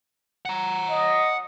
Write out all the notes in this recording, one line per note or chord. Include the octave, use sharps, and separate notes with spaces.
F#5 A#5
D#5